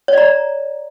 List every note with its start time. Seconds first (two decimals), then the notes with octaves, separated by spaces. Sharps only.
0.08 C#5
0.13 D5
0.18 A#5